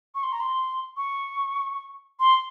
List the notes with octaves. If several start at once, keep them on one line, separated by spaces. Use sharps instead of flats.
C#6
C6
A#5
C6
C#6
C6